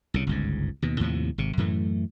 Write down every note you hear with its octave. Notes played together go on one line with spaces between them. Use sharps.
C2 C#3
G1 C#2 G#2
D#2 B2
D#2 A2 C3 F3
G#1 C3
F#2 A2 E3 A3